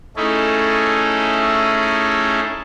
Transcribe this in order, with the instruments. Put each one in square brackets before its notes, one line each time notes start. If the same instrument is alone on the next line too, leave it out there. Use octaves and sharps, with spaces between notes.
[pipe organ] A3 C#4 D#4 E4 G#4 A4